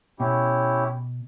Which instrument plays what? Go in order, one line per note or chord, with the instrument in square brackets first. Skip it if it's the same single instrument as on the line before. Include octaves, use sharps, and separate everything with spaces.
[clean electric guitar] B2 [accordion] C#4 E4 G4